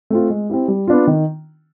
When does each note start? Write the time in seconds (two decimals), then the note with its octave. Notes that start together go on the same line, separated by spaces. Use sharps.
0.10 A3 C4 F4
0.30 G#3
0.50 C4 E4 G4
0.68 G3
0.87 B3 D4 F4
1.07 D#3